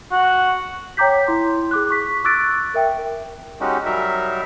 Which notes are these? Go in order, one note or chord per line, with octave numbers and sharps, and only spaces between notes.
F#4
C#5 G5 A#5 D6 G6 B6
E4 C6
G#4 D6 F#6
C#6 B6
C#6 D6 E6 F#6 A6 D7
A#4 E5 G5
G#3 C#4 D#4 F#4 G4
F#3 G3 D#4 A#4 E5